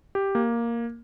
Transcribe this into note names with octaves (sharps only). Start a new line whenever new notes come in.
G4
A#3